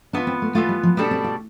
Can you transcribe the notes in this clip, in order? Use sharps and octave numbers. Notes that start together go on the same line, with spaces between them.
E3 B3 D4 F4
C4
A3
E3 A3 B3 F4
G3
F3
B2 G3 A3 D4 A4
C4
F4